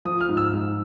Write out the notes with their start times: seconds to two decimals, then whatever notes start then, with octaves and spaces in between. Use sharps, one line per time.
0.05 F3 D#6
0.21 F6
0.29 G#2
0.37 E6
0.53 G#2